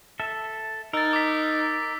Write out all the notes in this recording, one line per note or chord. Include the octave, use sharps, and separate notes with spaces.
A4 E5
D#4 A#4 E6 A6
D6 B6